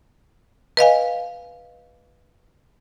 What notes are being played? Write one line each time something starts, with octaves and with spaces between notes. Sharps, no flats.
B4 D#5 F5 G#5